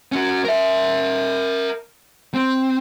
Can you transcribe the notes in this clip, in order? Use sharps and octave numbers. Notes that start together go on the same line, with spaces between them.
C#4 F#4
A#4 E5
C4